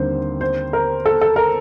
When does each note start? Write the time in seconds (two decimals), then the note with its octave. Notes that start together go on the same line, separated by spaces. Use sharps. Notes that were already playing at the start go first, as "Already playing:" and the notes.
Already playing: D#2 D3 G3 C4 C5
0.41 C5
0.73 A#4
1.06 A4
1.21 A4
1.36 A#4